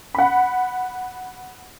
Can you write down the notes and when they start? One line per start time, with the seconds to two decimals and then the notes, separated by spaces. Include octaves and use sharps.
0.15 F#5 B5